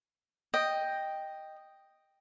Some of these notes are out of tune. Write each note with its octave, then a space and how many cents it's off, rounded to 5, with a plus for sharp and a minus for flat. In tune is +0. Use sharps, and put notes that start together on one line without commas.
D#5 +0 G5 +0